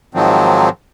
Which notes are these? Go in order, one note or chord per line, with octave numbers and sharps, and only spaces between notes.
G#2 D#3 F3 F#3 C4